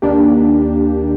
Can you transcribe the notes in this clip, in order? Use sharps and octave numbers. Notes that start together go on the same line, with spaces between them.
D#2 D#3 A#3 D4 G4